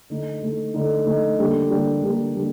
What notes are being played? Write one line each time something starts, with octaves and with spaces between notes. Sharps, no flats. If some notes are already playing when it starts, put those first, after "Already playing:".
D3 A3 D#4
D3 A3 D#4
D3 A3 D#4
D3 A3 D#4
D3 G3 A#3 D4 G4
D3 G3 A#3 D4 G4
D3 G3 A#3 D4 G4
D3 G3 A#3 D4 G4